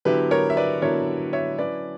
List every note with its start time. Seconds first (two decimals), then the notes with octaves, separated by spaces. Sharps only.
0.05 D3 F#3 B3 E4 G4 B4
0.31 A#4 C#5
0.50 E5
0.57 B4 D5
0.82 D3 F#3 B3 E4 A#4 C#5
1.33 C#5 E5
1.58 F#3 C#4 E4 B4 D5